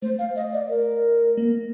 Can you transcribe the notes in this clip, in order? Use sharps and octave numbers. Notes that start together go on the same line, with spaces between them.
A3 C5
F5
D#5
D5
A#4
A#3